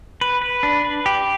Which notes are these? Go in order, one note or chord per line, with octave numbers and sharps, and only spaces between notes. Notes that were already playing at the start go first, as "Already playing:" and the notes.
B4
B4
D4
B4
G4